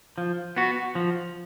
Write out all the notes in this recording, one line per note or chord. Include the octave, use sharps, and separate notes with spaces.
F3
B3 F#4
F3